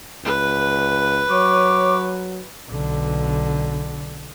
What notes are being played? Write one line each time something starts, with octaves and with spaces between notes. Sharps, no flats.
C#2 B4
F#3 C#5 D6
B1 D3